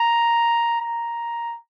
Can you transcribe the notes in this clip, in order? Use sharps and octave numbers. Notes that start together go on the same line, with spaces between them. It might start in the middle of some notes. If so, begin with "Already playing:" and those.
Already playing: A#5
A#5